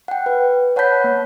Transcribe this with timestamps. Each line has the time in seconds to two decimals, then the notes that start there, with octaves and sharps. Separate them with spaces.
0.08 F#5 G5
0.26 B4
0.76 C#5 F#5 A5 B5 G6 B6
1.04 A#3